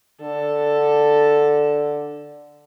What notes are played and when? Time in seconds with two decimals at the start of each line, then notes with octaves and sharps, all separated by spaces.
0.21 D3 A4